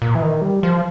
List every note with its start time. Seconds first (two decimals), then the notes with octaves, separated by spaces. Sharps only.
0.02 A#2
0.15 E3
0.22 D#3
0.42 G3
0.63 F3